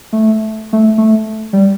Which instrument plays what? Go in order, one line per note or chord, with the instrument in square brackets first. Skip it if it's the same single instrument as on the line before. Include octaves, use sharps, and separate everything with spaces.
[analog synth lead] A3
A3
A3
G3